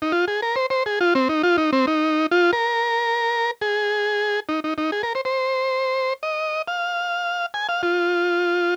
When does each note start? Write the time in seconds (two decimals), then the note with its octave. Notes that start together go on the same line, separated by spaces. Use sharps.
0.02 D#4
0.12 F4
0.28 G#4
0.42 A#4
0.56 C5
0.70 C5
0.86 G#4
1.01 F4
1.15 C4
1.29 D#4
1.43 F4
1.58 D#4
1.73 C4
1.87 D#4
2.31 F4
2.53 A#4
3.61 G#4
4.49 D#4
4.64 D#4
4.78 D#4
4.92 G#4
5.03 A#4
5.15 C5
5.25 C5
6.23 D#5
6.68 F5
7.54 G#5
7.69 F5
7.83 F4